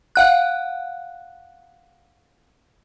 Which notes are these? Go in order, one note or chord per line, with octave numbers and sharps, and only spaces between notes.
F5 F#5 F#6